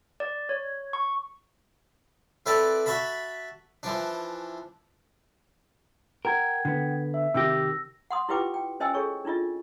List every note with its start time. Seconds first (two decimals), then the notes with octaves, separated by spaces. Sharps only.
0.20 D5
0.49 C#5
0.93 C#6
2.46 C4 E4 A4 B4 D5 A5
2.86 F#4 E5 A5 B5
3.83 E3 F3 D4
6.25 A#4 F#5 G5 G#6
6.65 D3 B3
7.14 E5
7.34 C3 D#3 G4 E6 A#6
8.11 F#5 C6 D#6
8.29 E4 F4 G4 B4 G5 D6
8.54 G5
8.80 C#4 C5 D#5 G5 G#5 E6
8.94 G#4 A4 C#5 C#6
9.25 D4 E4 F4 D#5